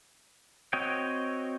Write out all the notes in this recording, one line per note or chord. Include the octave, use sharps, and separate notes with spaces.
C4 F#4 C#5 D#5 G5